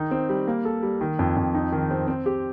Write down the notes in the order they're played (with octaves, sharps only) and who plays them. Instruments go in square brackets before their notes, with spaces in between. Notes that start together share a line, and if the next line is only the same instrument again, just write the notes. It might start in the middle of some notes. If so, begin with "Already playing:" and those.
Already playing: [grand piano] D#3 D#4
C4
G3
A#3
A4
G3
D#3
F2
F2
D#4
D#3
C4
C4
G4